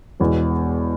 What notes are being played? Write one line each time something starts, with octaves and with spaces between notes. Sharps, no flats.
E1 E2 B2